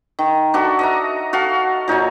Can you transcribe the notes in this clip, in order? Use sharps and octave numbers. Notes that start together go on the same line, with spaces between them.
D#3
D4 F#4 A4 E5
D#5 E5 A#5
F#4 A4 F5
A#2 D#4 F#4 C#5